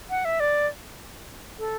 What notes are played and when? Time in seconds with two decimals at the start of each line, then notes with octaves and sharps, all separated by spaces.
0.10 F#5
0.25 E5
0.40 D5
1.59 A4